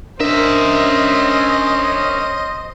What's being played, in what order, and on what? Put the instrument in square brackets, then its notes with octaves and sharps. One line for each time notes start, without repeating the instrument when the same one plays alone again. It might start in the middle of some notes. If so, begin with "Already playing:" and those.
[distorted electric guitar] C#4 E5 [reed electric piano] D4 A#4 [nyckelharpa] C5 [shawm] D#5